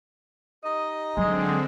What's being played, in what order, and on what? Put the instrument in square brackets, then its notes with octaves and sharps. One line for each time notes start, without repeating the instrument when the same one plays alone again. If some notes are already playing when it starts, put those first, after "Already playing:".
[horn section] D#4 G4 D#5
[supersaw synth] D3 C4 [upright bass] F#3 [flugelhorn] G#3